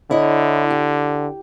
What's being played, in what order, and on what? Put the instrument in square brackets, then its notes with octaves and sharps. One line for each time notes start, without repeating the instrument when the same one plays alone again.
[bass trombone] D3 [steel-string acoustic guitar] E4 C#5 D#5
[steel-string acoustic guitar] G4